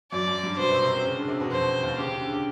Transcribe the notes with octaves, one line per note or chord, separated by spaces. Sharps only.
F#2 F#3 D5
F#2 F#3
G2 G3
B2 B3 C5
C3 C4
C3 C4
C3 C4
C#3 C#4
D3 D4
C3 C4
B2 B3
F2 F3 C5
D#2 D#3
C#3 G4
C#3
D3
C#3